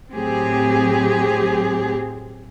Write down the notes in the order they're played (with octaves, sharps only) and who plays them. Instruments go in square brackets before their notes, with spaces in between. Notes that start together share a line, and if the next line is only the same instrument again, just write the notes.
[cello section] A2 F#3 C4 G4 G#4